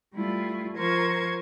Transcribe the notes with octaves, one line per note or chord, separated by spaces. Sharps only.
G3 A3 E4 F4
F3 F4 A#4 C5 C#6 G#6